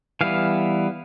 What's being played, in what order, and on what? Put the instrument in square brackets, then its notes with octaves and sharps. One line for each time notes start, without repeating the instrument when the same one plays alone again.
[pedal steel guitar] E3 G3 B3 F5